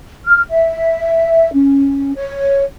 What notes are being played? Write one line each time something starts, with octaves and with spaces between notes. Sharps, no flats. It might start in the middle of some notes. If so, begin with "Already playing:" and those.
F6
E5
C#4
C#5